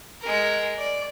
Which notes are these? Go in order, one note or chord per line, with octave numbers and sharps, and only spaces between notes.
G#3 A#4
D5